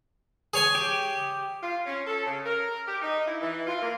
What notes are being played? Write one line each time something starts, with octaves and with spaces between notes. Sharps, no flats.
G#4 C#5 G#5
G4
F4
C#4
A4
C#3
A#4
G4
D#4
E4
E3
F4
A#3